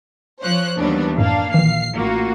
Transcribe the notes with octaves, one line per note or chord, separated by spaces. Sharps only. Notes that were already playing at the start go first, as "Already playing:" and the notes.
F3 C5 C#5 F#6
D#2 E3 F#3 G3 B3 D4
F#2 A2 A#3 D4 F5
A#1 D#3 E3 C7
A1 A#3 F4 F#4